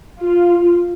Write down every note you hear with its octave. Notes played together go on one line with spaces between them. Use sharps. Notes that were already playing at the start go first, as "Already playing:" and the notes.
F4